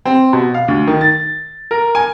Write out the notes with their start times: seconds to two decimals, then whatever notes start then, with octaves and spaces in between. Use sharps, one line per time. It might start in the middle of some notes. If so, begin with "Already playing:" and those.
0.05 C4
0.33 B2
0.54 F5
0.68 D2
0.87 D#3
1.01 A6
1.71 A#4
1.95 G#5